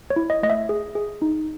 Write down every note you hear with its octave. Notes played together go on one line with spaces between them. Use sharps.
C#5
E4
D#5
A3 D#5
E5
G#4
G#4
D#4